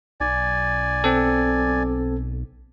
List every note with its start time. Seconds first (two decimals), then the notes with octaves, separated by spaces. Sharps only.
0.20 B1 D5 G#5
1.04 C4 A4